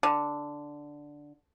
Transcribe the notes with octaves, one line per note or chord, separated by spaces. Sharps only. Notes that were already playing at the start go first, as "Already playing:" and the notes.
D3